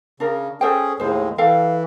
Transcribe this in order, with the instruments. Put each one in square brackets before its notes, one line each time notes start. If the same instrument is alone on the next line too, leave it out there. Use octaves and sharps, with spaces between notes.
[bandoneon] C#3 [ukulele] D4 A#4
[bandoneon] C#4 G#4 [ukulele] A4 C5 G5
[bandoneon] D#2 A2 G#3 [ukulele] G#4 C5
[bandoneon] E3 [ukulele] A4 F5 G5